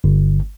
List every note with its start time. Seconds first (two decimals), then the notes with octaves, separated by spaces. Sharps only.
0.04 G1